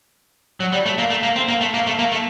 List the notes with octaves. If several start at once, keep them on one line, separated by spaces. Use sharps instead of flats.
F#3
G3
A3
A#3
A3
A#3
C4
A#3
A3
A#3
A3
A#3
A3